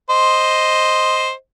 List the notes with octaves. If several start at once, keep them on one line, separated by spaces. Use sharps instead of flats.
C5 D#5